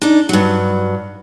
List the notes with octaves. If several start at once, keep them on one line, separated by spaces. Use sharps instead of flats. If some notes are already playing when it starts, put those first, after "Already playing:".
D4 D#4
G2 F#3